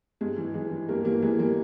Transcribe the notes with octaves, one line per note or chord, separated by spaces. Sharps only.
G2 G#3
E3
E3 G#3
E3
G2 G3 A#3
E3 G3 A#3
E3 G#3
E3 G3 A#3